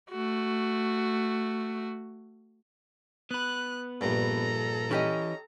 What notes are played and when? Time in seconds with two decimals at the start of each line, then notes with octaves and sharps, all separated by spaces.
0.11 A3 F#4
3.31 B3 B4 F#6
4.01 A#1 G2 A4 A#5
4.91 E3 C#4 G4 D#5